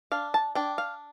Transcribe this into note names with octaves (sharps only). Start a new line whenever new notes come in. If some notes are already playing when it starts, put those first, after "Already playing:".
D4 F5
A5
D4 G5
F5